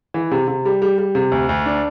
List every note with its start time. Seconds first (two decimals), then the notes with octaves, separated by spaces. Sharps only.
0.14 E3
0.31 C3
0.48 C3
0.65 G3
0.82 G3
0.98 G3
1.15 C3
1.32 D2
1.49 D2
1.66 D4